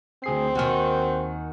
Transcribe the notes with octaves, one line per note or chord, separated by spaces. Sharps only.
D2 C4 G#4 C7
D#2 D#3 F#4 G#5 F6